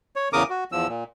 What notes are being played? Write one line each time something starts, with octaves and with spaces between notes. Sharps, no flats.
C#5
E2 C#3 A#4 D6 D#6
F#4
E2 F3 E6
A#2